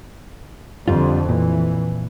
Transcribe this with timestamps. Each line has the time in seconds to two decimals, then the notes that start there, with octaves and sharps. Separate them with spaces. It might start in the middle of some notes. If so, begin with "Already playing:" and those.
0.88 F2 D3 G3 F4
1.29 A#2 E3